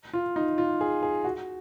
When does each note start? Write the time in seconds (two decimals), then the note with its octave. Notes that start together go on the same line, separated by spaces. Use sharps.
0.13 F4
0.36 D#4
0.58 F4
0.81 G#4
1.03 G#4
1.24 F#4